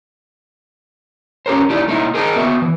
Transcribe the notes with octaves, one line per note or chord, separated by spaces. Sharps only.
C#4 G4 A#4 C5
A3 D#4 E4 G4 D5
A3 D#4 E4
G#4 A#4 C5 D#5 G5 G#5
B3 C4 F#4 E5
E3